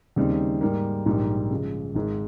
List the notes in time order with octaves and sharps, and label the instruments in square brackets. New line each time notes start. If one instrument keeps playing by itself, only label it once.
[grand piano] D#2 C#3 G3 C4 D#4
G#2 G3 A#3
A#1 G#2 D#3 G3 A#3
C#3 F3 G#3
G#1 G#2 D#3 G#3